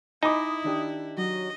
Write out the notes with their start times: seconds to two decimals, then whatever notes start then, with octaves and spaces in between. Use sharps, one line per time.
0.23 D#4 E4 D#5 G#5 B5 D6
0.64 D#3 D4 G4
1.17 F#3 D#5